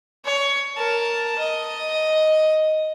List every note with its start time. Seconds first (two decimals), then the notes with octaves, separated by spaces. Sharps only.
0.25 C#5
0.77 A#4 A5
1.38 D#5